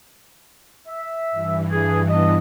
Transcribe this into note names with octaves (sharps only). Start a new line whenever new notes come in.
E5
G2 E3
D4 G#4
B3 D4 D#5